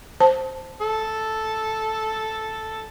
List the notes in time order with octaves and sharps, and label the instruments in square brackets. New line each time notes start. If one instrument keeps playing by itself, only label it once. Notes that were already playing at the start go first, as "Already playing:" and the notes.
[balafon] C5 A5
[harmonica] A4